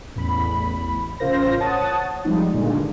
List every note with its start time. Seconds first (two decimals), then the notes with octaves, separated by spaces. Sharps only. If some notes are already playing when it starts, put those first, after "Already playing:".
0.15 A1 E2 B5
1.20 A1 C#3 F4 A#4 C5 A#6
1.60 C#5 F#5 A5 D#6 A6
2.25 F3 G3 G#3 C4 D#4
2.54 G2 A#2 D3 D#3 G#3